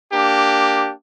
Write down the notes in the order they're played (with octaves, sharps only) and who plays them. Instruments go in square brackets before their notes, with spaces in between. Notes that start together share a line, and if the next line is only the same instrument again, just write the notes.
[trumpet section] A#3 D4 G4